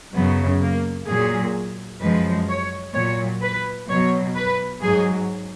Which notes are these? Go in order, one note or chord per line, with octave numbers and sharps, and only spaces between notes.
F#2 C#3 F#3 B3
A#3
A#2 F#3 G#4
F#2 F3 G#3 B4
C#5
A#2 F#3 C#5
B4
B2 F#3 C#5
B4
G#2 F#3 G#4